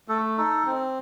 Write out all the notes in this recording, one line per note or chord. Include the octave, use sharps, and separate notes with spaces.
A3 A4
D#4 A4
C4